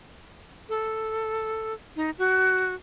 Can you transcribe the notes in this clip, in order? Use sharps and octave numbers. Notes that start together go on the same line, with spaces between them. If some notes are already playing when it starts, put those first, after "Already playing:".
A4
D#4
F#4